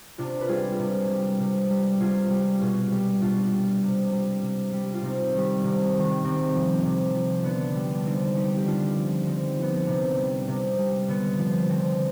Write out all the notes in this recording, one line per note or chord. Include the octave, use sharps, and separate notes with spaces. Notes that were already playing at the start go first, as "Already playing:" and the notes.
C3 D4 F4
B4
G3 F4 G#4
C3
G3
C3
G3
C3 F4 G#4
G3
B2 F4 G#4
G3
B2 D4 F4
G3
C3
G3
C3
G3
F4
C3 C4 D#4
D#3 G3
C3
G3
D#3
C3 C4
F3
C3
F3
D3 B3 D4
G3
D4
D3 C4 D#4
G3 D#4 G4
G4
D3 D4 F4
F3
D3 C4 D#4
F3 B3
C4
C3 B3 D4
G3
C3
G3
D3 B3
F3
D3 C4